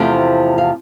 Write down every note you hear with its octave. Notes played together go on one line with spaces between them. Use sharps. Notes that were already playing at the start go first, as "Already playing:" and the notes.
Already playing: E2 C3 F3 A3 C4
F5